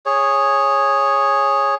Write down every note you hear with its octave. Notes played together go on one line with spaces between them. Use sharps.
G#4 C#5